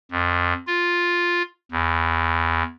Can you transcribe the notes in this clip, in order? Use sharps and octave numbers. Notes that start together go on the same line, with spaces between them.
F2
F4
E2